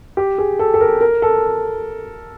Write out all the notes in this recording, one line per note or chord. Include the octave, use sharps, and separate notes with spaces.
G4
G#4
A4
A4
A#4
A#4
A4